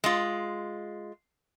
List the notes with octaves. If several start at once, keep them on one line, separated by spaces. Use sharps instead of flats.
G#3 F4